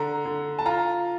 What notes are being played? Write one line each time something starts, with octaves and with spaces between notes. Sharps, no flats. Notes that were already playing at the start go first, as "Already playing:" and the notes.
Already playing: D3 A#5
D3
A5
F4 A#5